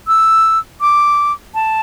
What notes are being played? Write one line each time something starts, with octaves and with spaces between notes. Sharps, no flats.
E6
D6
A5